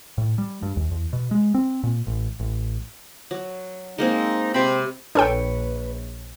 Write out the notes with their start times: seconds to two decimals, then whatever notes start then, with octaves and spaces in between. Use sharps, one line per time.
0.18 A2
0.38 G3
0.63 G2
0.77 D#2
0.91 E2
1.13 B2
1.31 G#3
1.54 C4
1.83 A#2
2.07 A1
2.40 A1
3.31 F#3
3.98 G#3 A#3 C4 D#4
4.54 C3 C4 B5
5.15 A#1 D4 A4 B4 C#5 G5